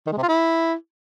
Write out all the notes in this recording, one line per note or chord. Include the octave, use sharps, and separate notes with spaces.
D#3
G#3
C3
F4
E4